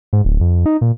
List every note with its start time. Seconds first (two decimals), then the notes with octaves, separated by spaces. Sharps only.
0.13 G#2
0.25 D1
0.41 F2
0.66 D#4
0.81 A#2